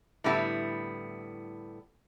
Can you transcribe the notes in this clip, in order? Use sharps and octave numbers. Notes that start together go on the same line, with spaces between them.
A2 D3 G3 B3 E4